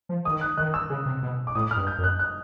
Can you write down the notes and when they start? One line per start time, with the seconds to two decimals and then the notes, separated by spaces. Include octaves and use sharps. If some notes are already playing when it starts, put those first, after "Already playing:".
0.09 F3
0.25 D#3 D#6
0.41 F#6
0.57 D#3 F#6
0.74 E6
0.90 C#3
1.06 C3
1.23 B2
1.47 D6
1.55 A2 D#6
1.71 F6
1.76 G2
1.87 G6
1.98 F#2
2.04 F#6
2.19 F#6